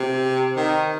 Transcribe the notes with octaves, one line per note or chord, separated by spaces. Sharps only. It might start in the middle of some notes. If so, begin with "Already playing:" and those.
Already playing: C3
D#3